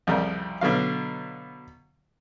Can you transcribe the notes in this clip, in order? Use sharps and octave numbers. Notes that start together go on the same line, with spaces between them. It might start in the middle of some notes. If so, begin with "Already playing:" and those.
C2 F2 C#3 G3 A#4
B2 D3 F#3 F5